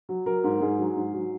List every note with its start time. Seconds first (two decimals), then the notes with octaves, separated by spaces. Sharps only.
0.09 F#3
0.26 F#3 A#4
0.44 G#2
0.61 G#2 G#4
0.79 F#3
0.96 G#2
1.14 F#3